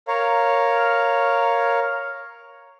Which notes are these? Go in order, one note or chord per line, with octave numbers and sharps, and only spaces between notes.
A#4 C#5 F5